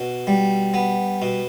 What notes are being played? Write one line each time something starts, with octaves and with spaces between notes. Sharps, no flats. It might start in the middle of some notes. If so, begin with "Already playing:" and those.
Already playing: B2
G3
B3
B2